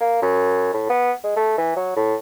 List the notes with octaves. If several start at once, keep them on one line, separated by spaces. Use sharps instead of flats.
A#3
F#2
A2
B3
G#3
A3
E3
F#3
A2